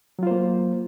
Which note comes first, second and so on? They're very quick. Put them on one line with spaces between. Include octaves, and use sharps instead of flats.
F#3 F4 C5 A#3